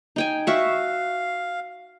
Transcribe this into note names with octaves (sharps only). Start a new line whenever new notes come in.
D#4 G5 G#5
F#4 E5 F5 C#6